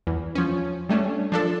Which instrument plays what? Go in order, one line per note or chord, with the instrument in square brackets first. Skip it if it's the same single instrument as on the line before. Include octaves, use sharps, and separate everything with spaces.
[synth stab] E2
F3 C#4
G3 A3 C#4 D4
F3 D4 A4